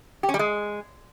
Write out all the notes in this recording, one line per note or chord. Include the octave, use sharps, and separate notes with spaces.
G4
C#4
G3
G#3